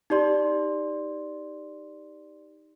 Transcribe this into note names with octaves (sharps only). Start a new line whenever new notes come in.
D#4 G4 D5 C6